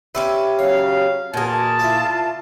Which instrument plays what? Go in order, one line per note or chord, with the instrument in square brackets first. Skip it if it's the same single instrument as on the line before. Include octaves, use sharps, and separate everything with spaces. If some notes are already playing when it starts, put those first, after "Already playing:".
[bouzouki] C#4 G4 B4 [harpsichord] D5 E5 C6
[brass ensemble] C#3 F#3 F5 [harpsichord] C#5
[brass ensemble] E2 F#4 A#4 [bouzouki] A#2 G#4 [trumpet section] A5
[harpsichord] E4 A#4 D5 [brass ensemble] F4